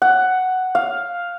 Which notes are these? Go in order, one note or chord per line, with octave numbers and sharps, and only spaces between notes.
F#5
F5